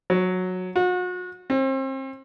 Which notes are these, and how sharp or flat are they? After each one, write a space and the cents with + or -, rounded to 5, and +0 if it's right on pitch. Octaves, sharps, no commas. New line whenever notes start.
F#3 -10
F#4 -40
C4 +35